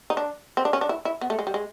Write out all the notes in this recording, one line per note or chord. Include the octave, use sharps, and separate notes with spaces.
D#4
D4
C4
D4
C#4
D4
E4
E4
B3
A3
G#3
G3
G#3